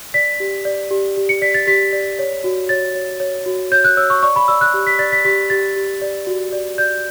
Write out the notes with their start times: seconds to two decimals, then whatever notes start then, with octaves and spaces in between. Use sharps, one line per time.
0.14 D5 B6
0.40 G4
0.65 D5
0.91 G4
1.17 G4
1.29 C#7
1.42 D5 B6
1.54 A6
1.67 G4 B6
1.93 D5
2.19 C#5
2.44 F#4
2.69 C#5 A6
2.95 C#5
3.20 C#5
3.46 F#4
3.71 C#5 G6
3.84 F#6
3.97 C#5 E6
4.10 C#6
4.22 D5 C#6
4.36 B5
4.48 D5 E6
4.61 F#6
4.74 G4
4.87 B6
4.99 D5 A6
5.12 B6
5.25 G4 B6
5.50 G4 A6
5.76 G4
6.02 D5
6.27 F#4
6.53 D5
6.78 D5 G6